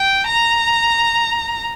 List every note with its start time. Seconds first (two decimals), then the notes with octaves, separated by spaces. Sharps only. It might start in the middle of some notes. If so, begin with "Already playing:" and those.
Already playing: G5
0.27 A#5